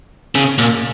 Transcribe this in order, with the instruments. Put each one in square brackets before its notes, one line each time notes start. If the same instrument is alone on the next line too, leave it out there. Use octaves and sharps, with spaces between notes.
[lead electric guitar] C#3
A#2